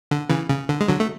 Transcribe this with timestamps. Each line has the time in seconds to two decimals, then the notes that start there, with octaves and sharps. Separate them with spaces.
0.11 D3
0.30 C#3 E3
0.50 C#3
0.69 D3
0.81 G#3
0.88 D3 F#3
1.00 A3